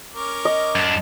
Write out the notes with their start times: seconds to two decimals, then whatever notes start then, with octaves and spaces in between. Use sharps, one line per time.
0.14 C#4 A#4 D6
0.45 D#5
0.75 F#2 D4